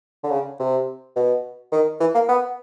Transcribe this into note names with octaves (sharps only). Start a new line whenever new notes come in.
D3
C#3
C3
B2
D#3
E3
A#3
B3